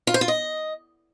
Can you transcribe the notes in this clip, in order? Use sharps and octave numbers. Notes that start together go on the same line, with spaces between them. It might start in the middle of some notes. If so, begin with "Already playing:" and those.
F4
C5
F4
D#5